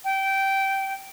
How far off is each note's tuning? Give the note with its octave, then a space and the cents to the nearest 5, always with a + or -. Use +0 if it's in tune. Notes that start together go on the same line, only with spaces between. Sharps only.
G5 -15